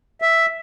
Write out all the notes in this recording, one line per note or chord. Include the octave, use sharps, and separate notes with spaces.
E5